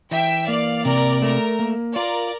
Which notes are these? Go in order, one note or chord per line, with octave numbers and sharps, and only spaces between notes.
E3 E5 G5
A#3 D5 F5
C3 A#4 D5
A3 A#4
A#3
F4 A#4 D5